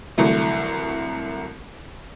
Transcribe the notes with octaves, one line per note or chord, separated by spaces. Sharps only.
C2 D3 E3 F#3 A3